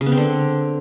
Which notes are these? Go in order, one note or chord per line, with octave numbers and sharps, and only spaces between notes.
C#3
B3
C4
D3